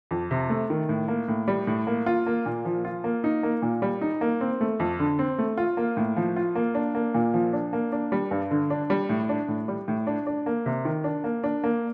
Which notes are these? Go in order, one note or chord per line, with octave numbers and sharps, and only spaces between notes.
F2
C3
A3
D#3
A2
A#3
A2
G3
A2
A#3
F4
A#3
A#2
F3
F4
A#3
D#4
A#3
A#2
G3
D#4
A#3
C4
A3
F2
D3
C4
A3
F4
A#3
A2
F3
F4
A#3
D4
A#3
A#2
F3
D4
A#3
D4
G3
G2
D3
D4
G3
A2
D4
A2
G3
A2
D4
D4
A#3
C3
D#3
D4
A#3
D4
A#3